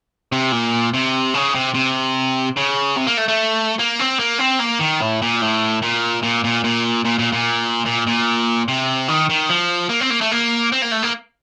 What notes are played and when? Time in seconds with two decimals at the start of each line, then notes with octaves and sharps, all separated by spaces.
0.32 C3
0.52 A#2
0.94 C3
1.34 C#3
1.55 C3
1.74 C3
2.57 C#3
2.97 C3
3.07 A#3
3.17 A3
3.28 A3
3.79 A#3
3.99 C4
4.19 A#3
4.39 C4
4.60 A#3
4.81 D#3
5.01 A2
5.22 A#2
5.42 A2
5.83 A#2
6.23 A#2
6.44 A#2
6.64 A#2
7.05 A#2
7.18 A#2
7.32 A#2
7.86 A#2
8.07 A#2
8.68 C3
9.08 D#3
9.29 D#3
9.50 F3
9.89 A#3
10.01 C4
10.10 A#3
10.21 A3
10.31 A#3
10.72 C4
10.82 A#3
10.91 A3
11.03 A#3